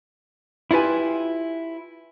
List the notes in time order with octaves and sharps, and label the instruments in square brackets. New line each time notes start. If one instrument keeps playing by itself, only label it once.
[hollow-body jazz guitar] E4 F4 G4 B4 G#5